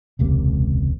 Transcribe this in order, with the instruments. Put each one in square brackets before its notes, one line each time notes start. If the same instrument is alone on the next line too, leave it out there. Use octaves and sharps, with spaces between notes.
[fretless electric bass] E1 C#2 C3 A#3